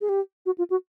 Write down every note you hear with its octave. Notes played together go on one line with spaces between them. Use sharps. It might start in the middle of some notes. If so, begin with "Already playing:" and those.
G#4
G4
F#4
F4
F#4